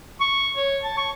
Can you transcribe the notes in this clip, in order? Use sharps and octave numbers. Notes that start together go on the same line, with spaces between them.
C#6
C#5
A5
C#6